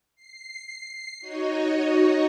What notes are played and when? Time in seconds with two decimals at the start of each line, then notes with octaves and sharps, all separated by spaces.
0.15 C7
1.20 D#4 F#4 C#5 D#5